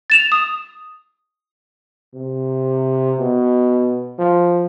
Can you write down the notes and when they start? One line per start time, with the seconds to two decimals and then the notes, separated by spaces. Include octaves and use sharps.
0.10 A6 E7 F7
0.32 D#6
2.14 C3
3.19 B2
4.19 F3